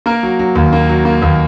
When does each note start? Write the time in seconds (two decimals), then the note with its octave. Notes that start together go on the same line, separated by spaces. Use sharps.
0.06 A#3 A#4
0.23 F#3
0.39 F#3
0.55 D#2
0.72 A#3
0.89 F#3
1.05 A#3
1.22 D#2